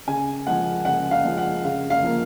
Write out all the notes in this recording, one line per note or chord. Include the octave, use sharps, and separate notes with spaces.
C#3 G#5
F3 G#3 F#5
C#3 F#5
F5
F3 G#3
F#5
C#3 F5
F5
F3 A#3